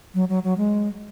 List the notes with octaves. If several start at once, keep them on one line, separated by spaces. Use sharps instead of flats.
F#3
F#3
F#3
G#3